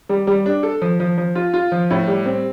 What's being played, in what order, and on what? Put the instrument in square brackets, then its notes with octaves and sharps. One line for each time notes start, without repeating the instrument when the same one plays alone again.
[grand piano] G3
G3
D4
A4
F3
F3
F3
F4
F4
F3
A2
G3
C4